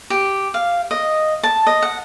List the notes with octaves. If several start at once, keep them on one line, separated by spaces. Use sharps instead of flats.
G4
F5
D#5
A5
D#5
F#5